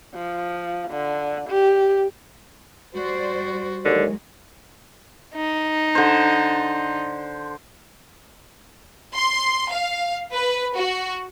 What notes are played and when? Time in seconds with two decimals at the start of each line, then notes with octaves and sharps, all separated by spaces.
0.15 F3
0.91 D3
1.50 G4
2.93 G3 F#4 C5 D5
3.85 D#2 D3 F#3 G#3
5.35 D#4
5.95 D3 C5
9.15 C6
9.71 F5
10.33 B4
10.76 F#4